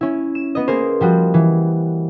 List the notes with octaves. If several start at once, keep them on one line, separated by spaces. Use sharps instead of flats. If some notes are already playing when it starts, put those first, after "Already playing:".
C#4 E4
E7
B3 D#5
A#3 G#4 A#4 C5
F3 G3 F#4
E3